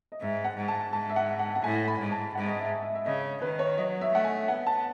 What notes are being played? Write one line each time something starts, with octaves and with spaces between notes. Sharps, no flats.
D#5
G#2 E5
F#5
G#2
A5
G#2 A5
E5
F#5
F#5
F#5
A2 G#5
B5
G#2
A5
G#2 F#5
D#5
E5
E5
E5
C#3 D#5
D#3 B4
C#5
F#3 D#5
E5
A3 F#5
G#5
E5
B3 F#5
A5